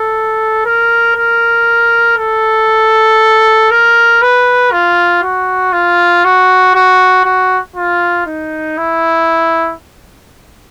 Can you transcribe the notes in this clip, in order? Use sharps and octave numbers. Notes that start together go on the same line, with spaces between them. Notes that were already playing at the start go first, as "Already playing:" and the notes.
Already playing: A4
A#4
A#4
A4
A#4
B4
F4
F#4
F4
F#4
F#4
F#4
F4
D#4
E4